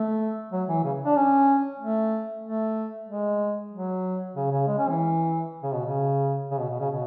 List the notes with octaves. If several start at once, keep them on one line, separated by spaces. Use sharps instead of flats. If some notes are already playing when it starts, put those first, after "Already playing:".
Already playing: A3
F#3
E3
C#3
D4
C#4
A3
A3
G#3
F#3
C#3
C#3
G#3
C#4
E3
C#3
B2
C#3
C#3
B2
B2
C#3
B2